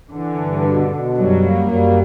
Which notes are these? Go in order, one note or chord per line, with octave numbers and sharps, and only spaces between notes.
D3 E3
G2
B2
B2
F#2 F#3 G3
A#3
F#2 F#3 G3